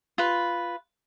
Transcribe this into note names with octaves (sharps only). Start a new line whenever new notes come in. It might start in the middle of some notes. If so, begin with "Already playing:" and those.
F4 B4